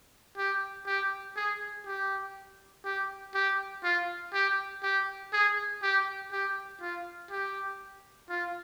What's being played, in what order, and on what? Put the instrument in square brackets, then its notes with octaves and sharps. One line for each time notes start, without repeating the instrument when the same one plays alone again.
[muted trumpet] G4
G4
G#4
G4
G4
G4
F4
G4
G4
G#4
G4
G4
F4
G4
F4